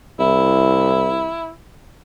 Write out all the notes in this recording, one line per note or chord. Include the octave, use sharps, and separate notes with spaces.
C2 E4